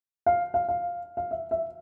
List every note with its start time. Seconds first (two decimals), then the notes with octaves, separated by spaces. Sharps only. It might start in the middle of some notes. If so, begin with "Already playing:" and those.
0.26 F5
0.54 F5
0.68 F5
1.17 F5
1.31 E5
1.51 E5